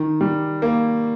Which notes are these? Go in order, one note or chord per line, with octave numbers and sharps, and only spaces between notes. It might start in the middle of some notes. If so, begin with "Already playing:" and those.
Already playing: D#3
G3
A#3